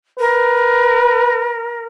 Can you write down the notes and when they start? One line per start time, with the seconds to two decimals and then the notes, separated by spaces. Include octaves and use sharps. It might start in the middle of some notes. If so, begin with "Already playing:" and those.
0.19 A#4 B4